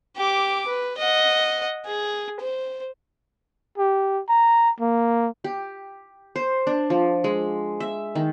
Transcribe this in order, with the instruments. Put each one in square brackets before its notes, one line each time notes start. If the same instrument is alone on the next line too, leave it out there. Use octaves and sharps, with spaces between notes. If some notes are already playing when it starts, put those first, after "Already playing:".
[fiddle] G4 D6
B4
D#5 F#5
G#4
C5
[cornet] G4
A#5
A#3
[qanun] G4
C5
D4
F3
G#3
E5
D#3